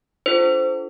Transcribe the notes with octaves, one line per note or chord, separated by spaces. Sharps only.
D4 F4 A4 C5